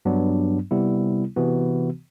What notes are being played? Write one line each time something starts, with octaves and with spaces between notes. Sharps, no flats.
G2 F#3 B3 D4
C3 G3 B3 E4
C3 E3 B3 F#4